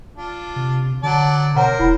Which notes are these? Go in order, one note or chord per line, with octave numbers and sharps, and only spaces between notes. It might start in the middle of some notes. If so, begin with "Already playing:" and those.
D4 F4
C3
D3 F#3 D5 A5
B2 A#4 C5 C#5 F#5 A#5
D#1 E4 B5